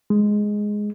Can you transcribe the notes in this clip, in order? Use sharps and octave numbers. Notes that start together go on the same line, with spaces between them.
G#3